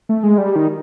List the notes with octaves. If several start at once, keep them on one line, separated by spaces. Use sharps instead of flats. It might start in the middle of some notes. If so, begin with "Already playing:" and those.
A3
G#3
G3
D#3